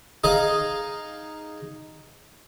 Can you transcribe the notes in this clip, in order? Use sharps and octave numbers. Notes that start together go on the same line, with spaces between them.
D#4 G#4 D#5 F5